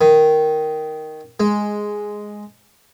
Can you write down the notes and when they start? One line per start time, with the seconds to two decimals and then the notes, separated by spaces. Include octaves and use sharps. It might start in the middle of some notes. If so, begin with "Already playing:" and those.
0.01 D#3
1.40 G#3